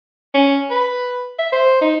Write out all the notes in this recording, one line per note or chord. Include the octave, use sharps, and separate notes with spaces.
C#4
B4
E5
C5
D#4